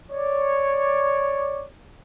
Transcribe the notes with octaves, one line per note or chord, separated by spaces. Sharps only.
C#5 D5